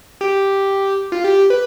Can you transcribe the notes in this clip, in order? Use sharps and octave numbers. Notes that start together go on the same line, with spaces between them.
G4
F4
G4
B4